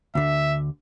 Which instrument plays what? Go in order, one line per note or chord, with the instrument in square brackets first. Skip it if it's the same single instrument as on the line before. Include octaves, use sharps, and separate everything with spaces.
[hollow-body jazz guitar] D2 D3 [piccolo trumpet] E5